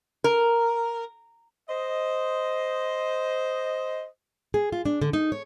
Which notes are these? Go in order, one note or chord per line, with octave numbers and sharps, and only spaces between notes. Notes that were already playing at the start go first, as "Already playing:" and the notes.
A#4
C5 D#5
G#4
F4
D4
D3
D#4
C#5